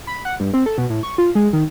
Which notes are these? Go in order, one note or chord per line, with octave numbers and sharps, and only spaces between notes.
B5
F#5
G2
C4
A4
B2
A2
C#6
F4
G#3
D#3